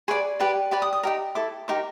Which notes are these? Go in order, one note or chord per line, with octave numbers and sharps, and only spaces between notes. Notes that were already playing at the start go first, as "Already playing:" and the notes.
G#4 B4 D5 C#6
G4 B4 D5
G4 B4 D5 D6
D#6
D#6
D#4 G4 A#4
E4 A4 D6
D#4 G4 A#4 D6